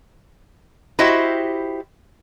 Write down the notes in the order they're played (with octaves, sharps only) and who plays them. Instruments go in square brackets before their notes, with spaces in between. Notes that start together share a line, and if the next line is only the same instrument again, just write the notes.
[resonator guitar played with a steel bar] E4 F#4 G4 C5 D#5 E5